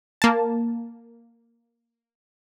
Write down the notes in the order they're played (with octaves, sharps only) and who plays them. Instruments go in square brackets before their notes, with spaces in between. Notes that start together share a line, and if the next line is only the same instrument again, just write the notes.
[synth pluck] A#3 A5